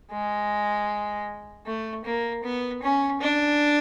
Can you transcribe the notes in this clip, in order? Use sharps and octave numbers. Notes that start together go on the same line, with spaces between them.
G#3
A3
A#3
B3
C#4
D4